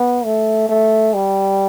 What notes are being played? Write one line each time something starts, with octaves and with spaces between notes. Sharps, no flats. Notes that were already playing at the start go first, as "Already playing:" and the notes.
Already playing: B3
A3
A3
G3